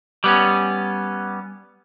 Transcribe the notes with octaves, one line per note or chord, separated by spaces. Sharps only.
G3 B3 C#4